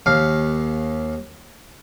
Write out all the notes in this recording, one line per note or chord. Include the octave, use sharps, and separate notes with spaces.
D#2 F5